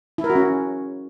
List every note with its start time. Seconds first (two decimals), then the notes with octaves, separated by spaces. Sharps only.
0.18 E4
0.24 A#4
0.30 F#4
0.35 C#4